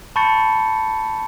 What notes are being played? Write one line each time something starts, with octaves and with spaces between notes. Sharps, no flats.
A5 B5 C#6 G6 A6 C#7